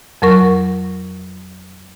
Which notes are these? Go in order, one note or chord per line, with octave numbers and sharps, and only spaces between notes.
F2 F#3 A#4 C#6